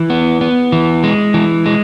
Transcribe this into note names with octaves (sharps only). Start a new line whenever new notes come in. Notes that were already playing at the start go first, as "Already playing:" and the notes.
Already playing: E3
B3
B3
E3
G#3
E3
G#3